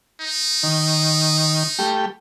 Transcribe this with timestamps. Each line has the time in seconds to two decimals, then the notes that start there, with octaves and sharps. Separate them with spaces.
0.22 D#4
0.63 D#3
1.79 G3 A3 G4